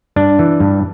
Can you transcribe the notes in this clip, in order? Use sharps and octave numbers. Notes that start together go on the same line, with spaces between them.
G2 D4
E3
G2